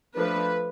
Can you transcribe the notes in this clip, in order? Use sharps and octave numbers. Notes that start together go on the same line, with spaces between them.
F3 A3 D4 B4